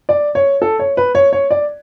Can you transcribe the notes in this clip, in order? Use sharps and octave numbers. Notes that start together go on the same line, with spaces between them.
D5
C#5
A4
C#5
B4
C#5
C#5
D5